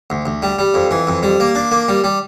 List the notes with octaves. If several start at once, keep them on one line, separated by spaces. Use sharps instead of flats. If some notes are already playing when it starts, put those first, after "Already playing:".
D2
D2
G3
G3
F2
E3
F2
G3
A#3
D4
A#3
G3
G3